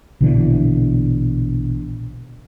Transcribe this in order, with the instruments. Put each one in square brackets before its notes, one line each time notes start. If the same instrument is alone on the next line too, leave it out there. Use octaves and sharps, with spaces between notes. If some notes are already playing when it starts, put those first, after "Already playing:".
[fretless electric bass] A#1 B2 D3 E3